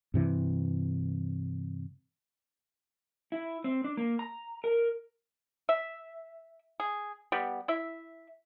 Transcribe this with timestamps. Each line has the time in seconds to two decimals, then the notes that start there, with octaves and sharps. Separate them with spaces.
0.14 G2 C3 E3
3.32 E4
3.64 C4
3.84 D4
3.97 A#3
4.19 A#5
4.64 A#4
5.69 E5
6.80 G#4
7.32 G3 B3 G4
7.68 E4 E5